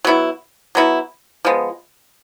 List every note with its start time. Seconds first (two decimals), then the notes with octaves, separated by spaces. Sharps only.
0.04 F#3 B3 E4
0.75 F#3 B3 E4
1.45 F3 G#3 B3